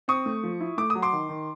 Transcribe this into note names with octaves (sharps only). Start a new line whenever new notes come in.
C4 C#6 D#6
A3
F3
E4
A3 D6
D#6
F#3
C6 D6
D#3
D#3